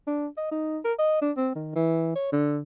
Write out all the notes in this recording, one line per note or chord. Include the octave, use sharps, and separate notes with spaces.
D4
D#5
D#4
A#4
D#5
D4
C4
D#3
E3
C#5
D3